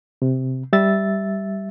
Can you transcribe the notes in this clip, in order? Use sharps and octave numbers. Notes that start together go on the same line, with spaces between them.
C3
G3 E5 A6